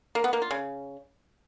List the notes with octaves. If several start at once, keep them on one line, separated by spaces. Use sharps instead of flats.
A#3
B3
A#3
F4
C#3